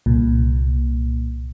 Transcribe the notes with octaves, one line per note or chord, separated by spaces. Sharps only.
C2 A#2